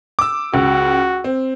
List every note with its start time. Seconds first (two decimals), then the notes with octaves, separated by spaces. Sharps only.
0.19 D6 E6
0.54 C#2 F#4
1.24 C4